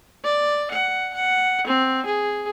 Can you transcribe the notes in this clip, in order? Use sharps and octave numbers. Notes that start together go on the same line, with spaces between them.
D5
F#5
F#5
C4
G#4